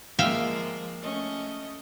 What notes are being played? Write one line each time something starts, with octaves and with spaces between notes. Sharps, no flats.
F3 G#3 A#3 E5 F5 G5
A3 C#4 D#5